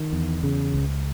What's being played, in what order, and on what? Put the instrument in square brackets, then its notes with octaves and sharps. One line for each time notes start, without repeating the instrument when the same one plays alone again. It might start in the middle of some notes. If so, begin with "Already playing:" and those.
Already playing: [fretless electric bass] D#3
E2
C#3
C#2